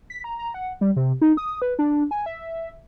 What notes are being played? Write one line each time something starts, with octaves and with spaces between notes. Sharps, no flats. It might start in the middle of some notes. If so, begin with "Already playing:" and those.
B6
A#5
A#5
F#5
G3
C3
D#4
D#6
B4
D4
G#5
E5